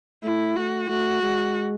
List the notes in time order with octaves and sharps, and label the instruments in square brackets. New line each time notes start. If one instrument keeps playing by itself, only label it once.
[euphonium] A3 [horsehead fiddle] E4
[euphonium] A3 [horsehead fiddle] F#4
[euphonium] A3 [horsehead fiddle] F#4
[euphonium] G#3